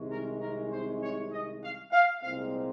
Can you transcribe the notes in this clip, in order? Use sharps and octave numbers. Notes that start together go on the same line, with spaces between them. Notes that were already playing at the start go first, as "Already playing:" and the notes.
Already playing: C2 C3 D#3 G#3 C#4
A#4
A#4
C5
C#5
D#5
F5
F5
C2 A#2 G#3 C4 F5